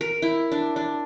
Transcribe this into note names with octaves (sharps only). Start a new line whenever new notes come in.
A#4
E4
D4
D4